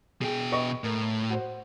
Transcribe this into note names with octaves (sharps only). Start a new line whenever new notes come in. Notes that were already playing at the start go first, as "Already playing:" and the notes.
B2 G#4 G5
B4 D#5 C#6
A2 A#4
F#4 C5